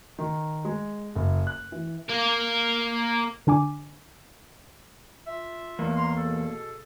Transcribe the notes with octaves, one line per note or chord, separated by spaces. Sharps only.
D#3
G#3
F#1
F#6
E3
A#3 A#4
D3 D4 G#5 D6
F4 E5
E2 A#3
A#5 C6
B2 G#4 A4